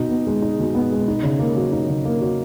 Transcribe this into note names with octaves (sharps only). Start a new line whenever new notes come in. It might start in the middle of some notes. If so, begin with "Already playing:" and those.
Already playing: B2 D#4
B3
G#3
D#4
B2
B3
G#3
D#4
C#3
A#3
F#3
D#4
C#3
A#3
F#3